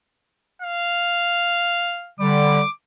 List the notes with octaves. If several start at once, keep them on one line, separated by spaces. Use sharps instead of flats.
F5
D3 G3 D6